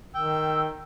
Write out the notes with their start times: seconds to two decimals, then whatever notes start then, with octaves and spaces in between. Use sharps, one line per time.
0.15 D#3 G5 E6